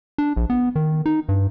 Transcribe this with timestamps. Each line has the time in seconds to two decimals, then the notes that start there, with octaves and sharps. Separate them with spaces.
0.18 D4
0.37 A#1
0.50 B3
0.76 D#3
1.06 D#4
1.29 G2